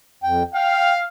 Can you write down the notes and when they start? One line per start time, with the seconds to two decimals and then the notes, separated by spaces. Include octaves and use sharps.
0.23 F2 G5
0.54 F5 G5